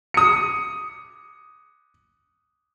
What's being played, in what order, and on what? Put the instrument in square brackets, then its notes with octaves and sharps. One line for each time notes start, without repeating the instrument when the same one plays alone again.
[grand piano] D#6 C#7